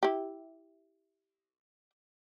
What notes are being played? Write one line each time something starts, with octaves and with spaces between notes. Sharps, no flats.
E4 G4